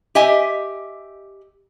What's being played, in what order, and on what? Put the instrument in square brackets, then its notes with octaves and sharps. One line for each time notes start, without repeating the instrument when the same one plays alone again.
[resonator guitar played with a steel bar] G4 D#5 E5 G#5